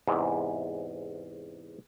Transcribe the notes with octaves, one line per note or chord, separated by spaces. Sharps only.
E2 G#2 C3